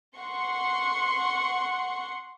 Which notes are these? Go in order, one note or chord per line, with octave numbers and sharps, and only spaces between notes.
F#5 C6 C#6